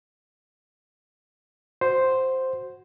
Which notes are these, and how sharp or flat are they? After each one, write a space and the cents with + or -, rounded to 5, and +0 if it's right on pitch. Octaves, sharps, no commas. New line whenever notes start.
F#4 +0 C5 +0